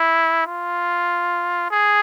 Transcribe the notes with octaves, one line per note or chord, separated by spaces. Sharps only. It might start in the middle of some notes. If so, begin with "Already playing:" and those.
Already playing: E4
F4
G#4